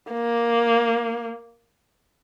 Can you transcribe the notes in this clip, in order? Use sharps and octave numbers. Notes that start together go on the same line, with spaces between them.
A#3